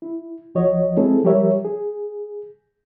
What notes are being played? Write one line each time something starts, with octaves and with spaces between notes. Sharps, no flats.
E4
C2 F3 F#4 C#5 D#5
G#3 C4 E4 G#4 A4
F3 G3 G4 A#4 C#5 E5
G#4